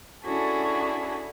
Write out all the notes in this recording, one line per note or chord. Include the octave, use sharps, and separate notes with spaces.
C#4 D4 E4 F#4 G#4 A4